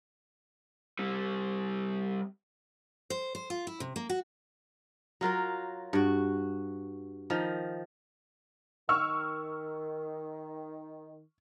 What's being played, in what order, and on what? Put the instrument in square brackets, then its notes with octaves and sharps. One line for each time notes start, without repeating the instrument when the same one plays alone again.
[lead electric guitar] G3 C4
[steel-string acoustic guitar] C5
C5
F4
E4
C3
A#3
F#4
[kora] F#3 F4 A#4 F5
G2 F#4
D#3 F3
[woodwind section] D#3 [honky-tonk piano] C#6 E6 F6